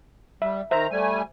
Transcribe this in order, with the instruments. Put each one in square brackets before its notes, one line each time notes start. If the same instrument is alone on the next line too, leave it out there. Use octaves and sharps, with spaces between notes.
[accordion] G3 [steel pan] E5
[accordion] D#3 A#5 [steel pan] C5 E5
[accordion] G3 A3 G#5